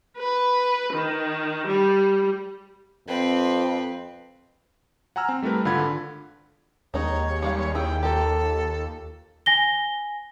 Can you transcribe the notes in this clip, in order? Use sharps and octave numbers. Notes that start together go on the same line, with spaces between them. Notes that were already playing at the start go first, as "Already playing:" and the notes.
B4
D#3
G3
F2 C4 B4
F#5 G#5 A#5 E6 F6
C4
G3 A3 E4 A#4 B4
G#1 D3 F4 F#5 B5 G#6
D#2 D#3 G#3 D#4 C#5
G3 G#3 F5
E4 G#4 G5
A#3 F4 G4 A4
G#5 A#6 G7